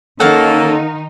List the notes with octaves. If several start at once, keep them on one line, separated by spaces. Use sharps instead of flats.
D#3 A#3 C#4 D#4 A4 F5 F#5